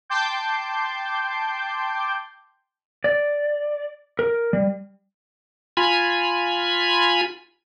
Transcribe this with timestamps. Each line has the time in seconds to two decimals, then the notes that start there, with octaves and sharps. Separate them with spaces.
0.09 G5 A5 C6 D6 G6
3.04 D5
4.19 A#4
4.53 G3
5.77 F4 G#5 B5